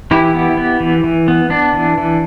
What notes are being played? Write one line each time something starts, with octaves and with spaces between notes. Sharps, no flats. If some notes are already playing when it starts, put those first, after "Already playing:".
E3 E4 G4
B3
B3
E3
E3
B3
B3 D4
E3
E3